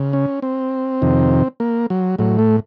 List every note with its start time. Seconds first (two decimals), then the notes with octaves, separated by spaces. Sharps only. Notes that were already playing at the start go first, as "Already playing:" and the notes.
Already playing: C#3
0.13 C#4
0.42 C4
1.02 F2 C3 D#3
1.60 A#3
1.90 F#3
2.19 A2 F#3
2.39 A3